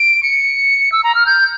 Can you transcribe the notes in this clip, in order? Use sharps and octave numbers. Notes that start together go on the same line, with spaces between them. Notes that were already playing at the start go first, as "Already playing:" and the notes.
Already playing: D7
C#7
E6
A#5
F6
G6